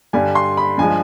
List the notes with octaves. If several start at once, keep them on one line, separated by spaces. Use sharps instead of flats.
G2 D3 G3 G#5
C6
B5
G2 F3 G#3 G#5